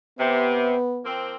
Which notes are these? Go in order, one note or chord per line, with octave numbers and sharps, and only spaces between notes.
C3 B3
F3 A#3 C4